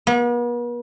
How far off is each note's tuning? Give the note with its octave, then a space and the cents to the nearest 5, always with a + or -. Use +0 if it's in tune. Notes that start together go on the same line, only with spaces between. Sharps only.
B3 -45